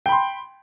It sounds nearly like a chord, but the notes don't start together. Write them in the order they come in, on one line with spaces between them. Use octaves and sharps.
G5 B5 C6